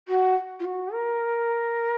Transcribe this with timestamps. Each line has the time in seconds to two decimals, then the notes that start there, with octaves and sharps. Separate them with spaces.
0.08 F#4
0.59 F4
0.64 F#4
0.92 A#4